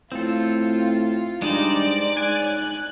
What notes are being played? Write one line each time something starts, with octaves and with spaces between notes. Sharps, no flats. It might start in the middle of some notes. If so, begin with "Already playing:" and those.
A2 C4 F4 A4
G2 G#3 D#4 C5 D5
G#2 G#5 F#6